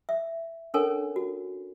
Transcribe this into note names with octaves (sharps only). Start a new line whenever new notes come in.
E5
C#4 D4 A4 A#4 C#5 G#5
F#4